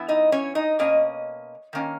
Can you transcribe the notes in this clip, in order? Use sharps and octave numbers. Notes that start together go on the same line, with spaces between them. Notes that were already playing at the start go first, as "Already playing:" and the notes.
Already playing: E3 B3 E4
D#4 D#5
C#4 C#5
D#4 D#5
B2 A#3 C#4 D#5
D#3 A#3 C#4